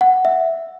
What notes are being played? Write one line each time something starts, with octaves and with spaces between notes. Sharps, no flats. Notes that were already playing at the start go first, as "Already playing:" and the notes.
F#5
E5